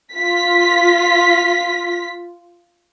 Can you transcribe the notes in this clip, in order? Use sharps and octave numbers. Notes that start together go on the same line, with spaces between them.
F4 B6